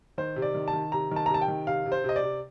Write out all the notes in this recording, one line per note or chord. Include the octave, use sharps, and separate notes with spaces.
D#3 C5
C3
D5
D#3
A5
D#3
C3 A#5
D#3
A5
A#5
C3
A5
G5
D#3
C3 F5
C3
C5
C3 D#5
D5
C3